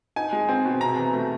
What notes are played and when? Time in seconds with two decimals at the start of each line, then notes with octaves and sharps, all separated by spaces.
0.16 D#4 G#5
0.33 G#3
0.49 C4
0.65 B2
0.81 C3 A#5
0.97 E3
1.13 A3